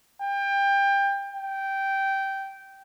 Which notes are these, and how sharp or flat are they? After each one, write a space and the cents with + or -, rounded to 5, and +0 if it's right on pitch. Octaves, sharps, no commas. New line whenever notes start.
G5 +25
G5 -10